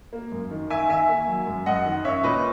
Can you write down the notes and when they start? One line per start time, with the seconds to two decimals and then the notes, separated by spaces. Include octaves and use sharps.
0.13 A#3
0.32 F#2
0.51 D#3
0.70 D#3 E5 G#5
0.89 D#3 E5 G#5
1.09 A#3
1.28 F#3
1.47 F#2
1.66 F#2 D#5 F#5
1.86 D#3
2.05 C#4 C#5 E5
2.24 A#2 B4 D#5